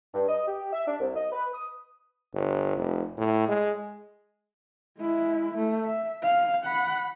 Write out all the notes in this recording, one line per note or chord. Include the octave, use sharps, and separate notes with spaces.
G2
D#5
G4
E5
D4
C2
D#5
B4
D#6
G1
F1
A2
G#3
G#3 E4
A3
E5
F5
F#5 B5